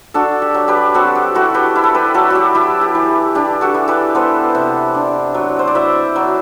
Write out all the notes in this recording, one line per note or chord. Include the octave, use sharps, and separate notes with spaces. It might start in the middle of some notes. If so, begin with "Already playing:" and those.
D4 F#4 A4
G4
F#3
G4 B4
C4 F#4 A4
G4
E4 F#4 A4
G4 B4
E4
A4
G4 B4
F#3 F#4 A4
F#4 G4
E4 G4
G4
E3
D4 G4
F#4 A4
E3
G4 B4
B3 A4 C5
C3
D4
F#3
C5
D5
E4 C5 E5
F#3